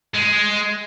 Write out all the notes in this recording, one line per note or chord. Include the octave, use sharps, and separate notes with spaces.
G#3